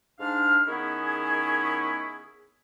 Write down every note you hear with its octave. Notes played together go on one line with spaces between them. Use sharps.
G#2 D4 F5 F6
D#3 B3 C#4 E4 G#4